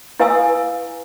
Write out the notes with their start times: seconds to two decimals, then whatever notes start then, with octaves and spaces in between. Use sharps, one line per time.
0.20 E4 B4 F5 G#5 D#6 E6